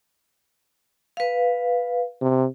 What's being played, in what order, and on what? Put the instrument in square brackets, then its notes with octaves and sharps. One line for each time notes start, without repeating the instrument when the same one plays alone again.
[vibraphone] B4 F5
[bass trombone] C3